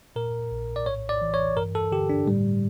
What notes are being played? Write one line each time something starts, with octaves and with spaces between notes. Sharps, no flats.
A#2 A#4
A#1
D5
A2 C#5
D5
E3
C#5
G2 A#4
A4
D3 G4
D4
A2 G3